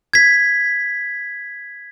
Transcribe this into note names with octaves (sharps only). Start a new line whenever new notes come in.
G#6 B6